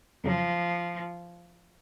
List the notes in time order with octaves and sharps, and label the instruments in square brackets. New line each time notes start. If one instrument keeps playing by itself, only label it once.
[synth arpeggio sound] F2 C#3 F#3 [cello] F3